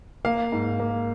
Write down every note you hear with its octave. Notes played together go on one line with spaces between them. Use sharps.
A#3 F5
G#2
A#3